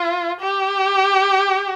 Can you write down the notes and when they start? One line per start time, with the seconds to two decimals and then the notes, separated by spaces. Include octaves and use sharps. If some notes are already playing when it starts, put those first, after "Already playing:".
Already playing: F4
0.41 G4